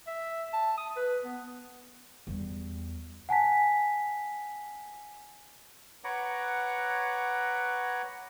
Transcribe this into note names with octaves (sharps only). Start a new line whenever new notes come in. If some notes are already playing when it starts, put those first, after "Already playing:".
E5
A5
D#6
B4
B3
E2 G3
F#5 G#5 A5 B6
B4 C#5 F#5 A#5 D6